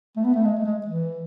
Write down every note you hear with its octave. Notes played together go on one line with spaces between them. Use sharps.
A3
B3
A3
G#3
A3
G#3
E3